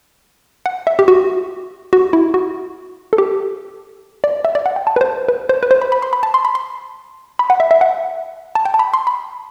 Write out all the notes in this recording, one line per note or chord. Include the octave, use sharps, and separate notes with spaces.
F#5
E5
G4
F#4
F#4
E4
F#4
A4
G4
D5
E5
D5
F#5
G5
A5
B4
C5
B4
C5
B4
C5
B5
B5
C6
B5
A5
C6
B5
C6
B5
F#5
E5
E5
F#5
A5
G5
A5
B5
C6
B5